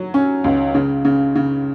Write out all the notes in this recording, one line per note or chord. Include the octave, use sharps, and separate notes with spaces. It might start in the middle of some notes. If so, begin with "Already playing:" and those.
Already playing: F#3
C#4
C#2
C#3
C#3
C#3